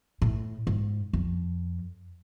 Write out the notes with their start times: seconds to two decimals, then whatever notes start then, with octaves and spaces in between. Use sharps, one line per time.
0.22 A2
0.67 G#2
1.13 F2